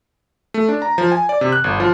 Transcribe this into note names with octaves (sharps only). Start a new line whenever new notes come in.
A3
D4
A#5
F3
G#5
D5
C3
F#6
G1
F3